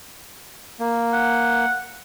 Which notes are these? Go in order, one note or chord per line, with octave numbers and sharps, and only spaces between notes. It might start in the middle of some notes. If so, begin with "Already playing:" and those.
A#3
F#5